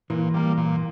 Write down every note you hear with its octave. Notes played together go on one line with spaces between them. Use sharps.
A#2 E3
G3 A#3
A#2